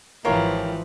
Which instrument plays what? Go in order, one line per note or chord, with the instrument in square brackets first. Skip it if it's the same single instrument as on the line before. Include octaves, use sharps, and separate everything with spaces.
[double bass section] G#1 F3 [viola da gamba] E3 [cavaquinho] F4 G4 [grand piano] A#4 C#5 A#5